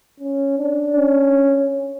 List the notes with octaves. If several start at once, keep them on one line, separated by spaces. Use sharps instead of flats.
C#4
D4
C#4